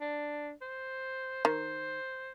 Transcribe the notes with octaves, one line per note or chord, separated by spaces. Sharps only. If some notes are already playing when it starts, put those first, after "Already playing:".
D4
C5
D#3 C5